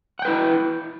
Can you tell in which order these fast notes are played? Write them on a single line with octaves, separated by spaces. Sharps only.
F#5 G5 B4 E4